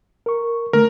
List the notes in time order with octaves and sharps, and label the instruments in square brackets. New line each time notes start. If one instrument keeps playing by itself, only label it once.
[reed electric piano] A#4 C#6
[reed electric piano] D3 A3 [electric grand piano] A#4